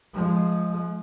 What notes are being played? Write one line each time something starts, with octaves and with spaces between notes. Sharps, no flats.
F3 G#3